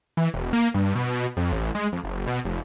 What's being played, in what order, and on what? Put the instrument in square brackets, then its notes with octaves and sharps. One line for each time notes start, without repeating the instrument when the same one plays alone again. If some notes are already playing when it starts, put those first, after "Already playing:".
[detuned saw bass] E3
E1
A#3
G2
B2
F2
A1
G#3
F2
F#1
B2
F1